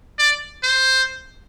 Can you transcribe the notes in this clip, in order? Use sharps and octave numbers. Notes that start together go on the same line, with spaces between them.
D5
C5